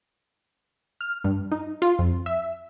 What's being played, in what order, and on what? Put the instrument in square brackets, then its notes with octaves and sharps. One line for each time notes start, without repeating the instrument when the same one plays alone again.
[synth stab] F6
G2
D#4
F4
F2
E5